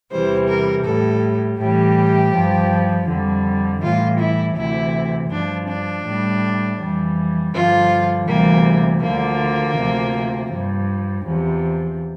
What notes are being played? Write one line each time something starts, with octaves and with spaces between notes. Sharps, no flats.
E2 C3 E3 G3 C5
A#4
A2 G3 A4
A2 E3 G3 G4
G2 F3
F2 D3 G3
A2 E3 G3 F4
E4
D2 C3 E3 E4
G2 F3 D4
D4
A2 G3
F2 E3 G3
G2 D3 F3 F4
D2 C3 E3 G3 A#3
D2 D3 F3 A#3
D2 C3 F3
G2 F3
E2 C3 F3